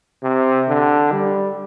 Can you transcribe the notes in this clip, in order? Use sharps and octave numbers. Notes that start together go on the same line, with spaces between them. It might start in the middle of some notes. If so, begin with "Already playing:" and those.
C3
D3
G3